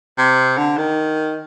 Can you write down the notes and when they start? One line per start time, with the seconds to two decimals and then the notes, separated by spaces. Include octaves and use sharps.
0.18 C3
0.57 D3
0.77 D#3